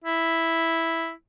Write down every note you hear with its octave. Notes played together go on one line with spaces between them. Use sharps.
E4